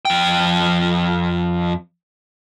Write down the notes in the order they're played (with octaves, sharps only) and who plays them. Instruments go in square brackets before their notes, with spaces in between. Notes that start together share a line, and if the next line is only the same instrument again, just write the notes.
[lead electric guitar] F2 G5